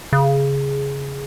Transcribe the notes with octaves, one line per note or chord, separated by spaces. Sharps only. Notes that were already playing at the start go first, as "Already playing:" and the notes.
C#3